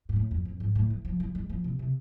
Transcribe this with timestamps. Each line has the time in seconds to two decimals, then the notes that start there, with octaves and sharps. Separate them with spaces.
0.09 G#2
0.16 A2
0.31 F2
0.45 F2
0.60 G#2
0.75 A2
0.90 E3
1.05 F3
1.20 F3
1.35 G#3
1.49 F3
1.64 C3
1.79 C3